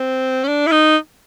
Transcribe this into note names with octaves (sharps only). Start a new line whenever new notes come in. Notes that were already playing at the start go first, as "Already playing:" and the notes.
Already playing: C4
C#4
D4
E4
D#4